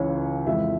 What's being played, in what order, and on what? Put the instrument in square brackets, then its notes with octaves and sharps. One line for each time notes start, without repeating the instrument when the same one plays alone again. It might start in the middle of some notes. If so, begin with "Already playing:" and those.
Already playing: [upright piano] C#2 C#3 E3 C#5
F2 E3 G#3 E5